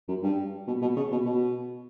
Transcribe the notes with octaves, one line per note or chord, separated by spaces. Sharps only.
F#2
G2
B2
B2
C#3
B2
B2